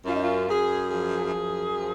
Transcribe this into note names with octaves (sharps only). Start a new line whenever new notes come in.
F#2 F4
D#4
F4
F#2 G#4
F3 G#4
F#2
F3